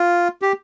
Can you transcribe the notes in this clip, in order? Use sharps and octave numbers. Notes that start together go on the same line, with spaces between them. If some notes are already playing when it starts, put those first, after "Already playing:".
Already playing: F4
G4